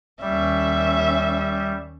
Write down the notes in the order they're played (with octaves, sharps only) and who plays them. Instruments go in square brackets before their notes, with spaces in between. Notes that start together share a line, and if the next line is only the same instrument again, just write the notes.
[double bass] D#2 C#4 [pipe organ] G3 [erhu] E5